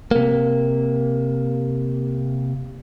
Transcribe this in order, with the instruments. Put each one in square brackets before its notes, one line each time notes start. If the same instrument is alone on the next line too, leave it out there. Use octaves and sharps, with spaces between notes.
[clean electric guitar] C3 A#3